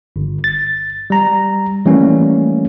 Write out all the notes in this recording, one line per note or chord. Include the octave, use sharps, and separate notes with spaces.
G1
A6
G3 A#5
E3 G3 A3 A#3 C#4